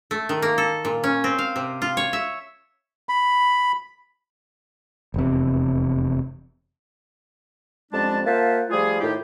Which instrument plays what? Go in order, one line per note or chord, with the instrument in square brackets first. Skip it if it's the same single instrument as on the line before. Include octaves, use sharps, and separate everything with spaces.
[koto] A3
D#3
A#3
A4
A#2
C#4
C4
F5
C3
F4
C#5
E5
[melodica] B5
[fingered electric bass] F1 E2 C3
[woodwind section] F2 G3 G#3 C#4 D4 A5
A#3 F4 C5 E5 F#5 A5
F3 G3 A3 F4 G#4
A2 D#3 D#4 F4 G4